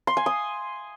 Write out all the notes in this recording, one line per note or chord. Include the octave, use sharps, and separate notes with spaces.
C6
G#5
D#6